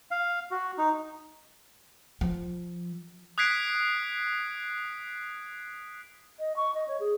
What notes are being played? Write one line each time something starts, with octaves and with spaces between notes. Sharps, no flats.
F5
F#4
D#4
F3
D#6 F#6 G#6 B6 C7 D7
D#5
C#6
D#5
C#5
G#4